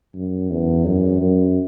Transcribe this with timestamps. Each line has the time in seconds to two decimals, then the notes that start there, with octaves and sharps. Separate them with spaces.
0.14 F#2
0.50 E2
0.86 F#2
1.21 F#2